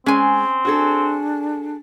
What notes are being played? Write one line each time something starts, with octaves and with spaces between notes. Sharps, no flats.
G#3 C4 C#4 G#5
D4 F#4 G#4 A4